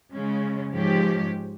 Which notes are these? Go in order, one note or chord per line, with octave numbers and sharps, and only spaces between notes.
C#3 G#3 C#4
G#2 F3 G#3 C#4 G4